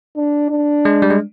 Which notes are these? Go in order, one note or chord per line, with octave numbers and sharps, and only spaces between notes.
D4
D4
G#3
G3
G#3